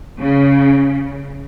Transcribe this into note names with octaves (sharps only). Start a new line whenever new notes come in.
C#3